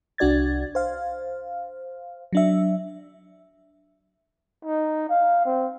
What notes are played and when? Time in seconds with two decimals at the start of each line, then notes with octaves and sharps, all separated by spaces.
0.18 C2 D4 F#4 D5 G#6 A6
0.75 C5 F5
2.33 F#3 D4 E5
4.65 D#4
5.09 F5
5.46 C4